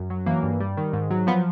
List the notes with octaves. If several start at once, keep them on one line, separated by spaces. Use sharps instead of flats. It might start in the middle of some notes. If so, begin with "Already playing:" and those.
Already playing: F#2
F#3
E3 A#3
G2
G3
D#3
G#2
F#3
F3 B3